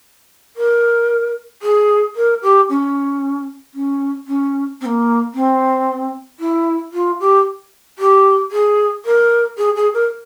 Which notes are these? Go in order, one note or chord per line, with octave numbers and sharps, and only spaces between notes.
A#4
G#4
A#4
G4
C#4
C#4
C#4
C4
A#3
C4
E4
F4
G4
G4
G#4
A#4
G#4
G#4
A#4